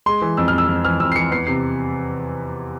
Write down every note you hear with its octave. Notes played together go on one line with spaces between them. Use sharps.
G#3 C6
E3
F2 E6
F2 F6
E6
F2
E3 F6
F2 E6
C7
E3 C#7
E2 C7
C3 C7